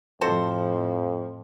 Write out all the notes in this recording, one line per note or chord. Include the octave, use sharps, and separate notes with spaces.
F2 A2 F3 F#4 A4 C5